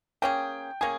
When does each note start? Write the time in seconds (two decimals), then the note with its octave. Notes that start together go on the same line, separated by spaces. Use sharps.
0.22 A#3 C#4 G#4 G5
0.81 A#3 C#4 G#4 G#5